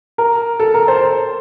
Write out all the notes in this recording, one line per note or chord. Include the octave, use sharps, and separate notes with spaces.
A#4
A4
A#4
C5